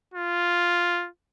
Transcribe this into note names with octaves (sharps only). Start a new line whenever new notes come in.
F4